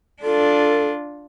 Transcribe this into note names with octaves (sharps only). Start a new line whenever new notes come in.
D4 F4 A4